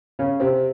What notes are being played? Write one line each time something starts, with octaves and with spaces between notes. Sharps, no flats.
C#3 C#4
C3 C4